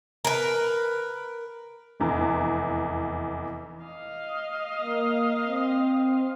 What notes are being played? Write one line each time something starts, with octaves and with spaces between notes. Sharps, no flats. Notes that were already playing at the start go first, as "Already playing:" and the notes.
A#4 B4
F1 E2 A#5
D#5 F5
A#3
C4